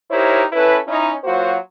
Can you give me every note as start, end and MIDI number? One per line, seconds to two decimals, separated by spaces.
0.11 0.42 63
0.11 0.42 64
0.11 0.42 67
0.11 0.42 70
0.11 0.42 72
0.11 0.42 73
0.53 0.77 61
0.53 0.77 64
0.53 0.77 69
0.53 0.77 71
0.87 1.11 61
0.87 1.11 63
0.87 1.11 64
1.24 1.55 54
1.24 1.55 58
1.24 1.55 65
1.24 1.55 66
1.24 1.55 72